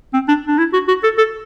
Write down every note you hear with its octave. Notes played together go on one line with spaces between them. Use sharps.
C4
D4
D4
E4
F#4
F#4
A4
A4